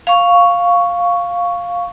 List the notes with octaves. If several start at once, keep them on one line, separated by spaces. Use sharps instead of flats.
F5 C#6